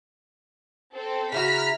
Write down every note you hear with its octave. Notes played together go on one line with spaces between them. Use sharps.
C4 A4
C#3 E4 F#4 A#5 F6 B6